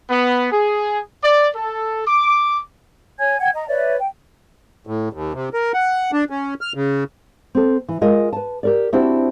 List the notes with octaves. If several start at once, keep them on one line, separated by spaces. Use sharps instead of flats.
B3
G#4
D5
A4
D6
C#5 G#5 G#6
F#5 G5 G#6
D#5 A#5
B4 C#5 D5 E5
G5
A2
D#2
C3
A#4
F#5
D4
C#4
F6
C#3
C4 A4
E3
G#3 F4 A#4 D#5
B4 A5
G4 A#4 D5
C4 D4 E4 F#4 G4 C5